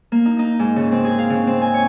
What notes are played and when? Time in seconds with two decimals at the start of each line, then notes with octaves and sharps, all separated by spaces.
0.12 A#3
0.26 D#4
0.39 D#4
0.59 G#2
0.76 C#3
0.92 C4
1.05 G#4
1.18 F5
1.30 C#3
1.47 C4
1.62 G#5
1.74 C#5